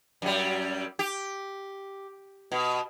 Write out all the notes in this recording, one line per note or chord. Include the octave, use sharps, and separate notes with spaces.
F#2 G3
G4
B2